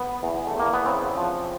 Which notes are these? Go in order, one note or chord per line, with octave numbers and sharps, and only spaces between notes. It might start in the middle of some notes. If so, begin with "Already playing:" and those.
Already playing: B3
E2
A3
E2 A#3
B3
C#3 C4
F3